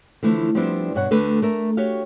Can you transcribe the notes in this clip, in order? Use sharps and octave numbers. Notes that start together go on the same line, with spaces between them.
D3 E3 F3 A3 E4
F3 G3 B3 C4 D4 E4
G2 B2 C#5 F#5
D2 D3 A3 B4
A3 A#4 E5
F#4 G4 C#5 F5